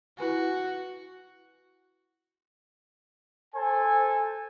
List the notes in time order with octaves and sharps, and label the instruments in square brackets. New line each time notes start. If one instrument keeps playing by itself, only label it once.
[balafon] E4 B4 G#5 [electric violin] F#4
[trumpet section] A4 C5 G#5